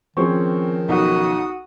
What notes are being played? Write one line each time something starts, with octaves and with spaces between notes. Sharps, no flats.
D#3 F3 C4 C#4 G#4 C#6
B1 D#4 F#4 D#6